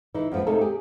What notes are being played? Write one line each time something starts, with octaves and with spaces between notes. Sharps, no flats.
E3 D#4
F#2 F3 B3
D#2 C3 A3 D#4 A4 A#4
G4 G#4